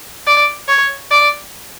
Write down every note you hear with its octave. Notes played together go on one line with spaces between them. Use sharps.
D5
C#5
D5